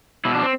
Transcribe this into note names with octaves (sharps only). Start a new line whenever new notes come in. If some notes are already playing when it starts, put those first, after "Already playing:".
B2 E4
D4
C4